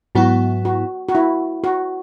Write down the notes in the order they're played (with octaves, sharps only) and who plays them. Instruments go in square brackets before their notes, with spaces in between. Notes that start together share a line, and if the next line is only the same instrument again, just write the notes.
[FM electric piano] G#2 F#3 B3 E4 [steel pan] F#4
[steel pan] F#4
F#4
E4
F#4